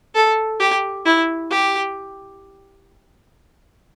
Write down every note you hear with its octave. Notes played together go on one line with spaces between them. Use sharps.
A4
G4
E4
G4